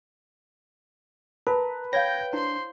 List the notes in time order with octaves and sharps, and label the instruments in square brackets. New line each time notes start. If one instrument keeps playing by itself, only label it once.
[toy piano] A#4 A5 [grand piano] B4 [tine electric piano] A#5
[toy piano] C#5 F5 [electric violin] G5 [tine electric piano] G6 G#6 A#6
[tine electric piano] D4 [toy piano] E4 [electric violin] C5 C6